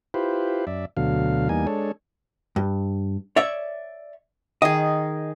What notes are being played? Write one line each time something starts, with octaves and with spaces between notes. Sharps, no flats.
E4 F4 G4 B4 C5
F#2 D5 E5
D2 B2 D3 F#3 F5
E2 G3 A#3 D#4 G#5
G#3 D4 A4 C#5
G2
C#5 D5 E5
D#3 G#4 D#5